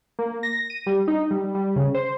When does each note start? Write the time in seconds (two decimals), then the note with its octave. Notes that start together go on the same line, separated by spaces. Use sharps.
0.19 A#3
0.43 A#6
0.70 D#7
0.86 G3
1.08 D#4
1.31 G3
1.55 G3
1.76 C#3
1.94 C5